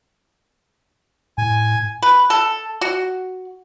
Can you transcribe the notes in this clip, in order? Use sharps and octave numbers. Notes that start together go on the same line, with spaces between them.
A2 G#5
B4
A4
F#4